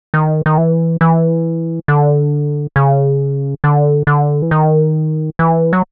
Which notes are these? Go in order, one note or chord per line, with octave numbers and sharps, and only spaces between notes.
D#3
D#3
E3
E3
D3
C#3
D3
D3
E3
D#3
E3
F#3